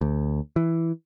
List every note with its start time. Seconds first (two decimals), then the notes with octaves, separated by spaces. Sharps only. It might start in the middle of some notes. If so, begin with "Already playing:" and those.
0.01 D2
0.56 E3